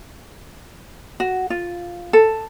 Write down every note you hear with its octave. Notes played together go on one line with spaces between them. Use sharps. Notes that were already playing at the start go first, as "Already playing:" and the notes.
F#4
F4
A4